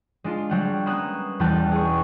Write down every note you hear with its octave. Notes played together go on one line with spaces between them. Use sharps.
G#3 D4 F4
F#3 G3 F#5
A#3 B3 C#4 D#6 F#6 E7
E1 E2 G3 G5 A5 F#6
G#4 C#6